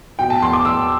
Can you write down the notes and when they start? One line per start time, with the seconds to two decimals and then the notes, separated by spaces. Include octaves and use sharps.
0.19 B2 G5
0.30 A5
0.42 E2 C6
0.53 D6
0.65 E2 E6